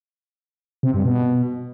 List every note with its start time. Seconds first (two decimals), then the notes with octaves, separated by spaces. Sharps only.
0.83 C3
0.94 G2
1.05 B2